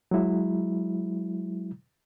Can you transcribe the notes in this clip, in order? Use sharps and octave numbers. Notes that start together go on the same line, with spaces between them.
F#3 G#3 E4